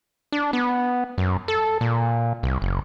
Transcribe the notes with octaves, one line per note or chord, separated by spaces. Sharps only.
D4
B3
F#2
A4
A#2
C2
F#1